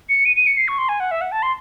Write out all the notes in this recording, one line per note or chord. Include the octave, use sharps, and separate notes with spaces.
C#7
D#7
D#7
C#7
C7
C#6
C6
G#5
F#5
E5
F#5
A5
C6